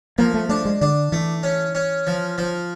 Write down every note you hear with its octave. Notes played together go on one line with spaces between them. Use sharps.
F3 A#3
A3
A3 D4
G#3
D3 D4
E3 A3
C#4
C#4
F3
F3